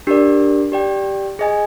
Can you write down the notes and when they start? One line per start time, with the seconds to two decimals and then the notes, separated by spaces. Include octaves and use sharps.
0.07 D4 G4 A#4 D5
0.72 G4 D5 G5
1.39 G#4 D#5 G#5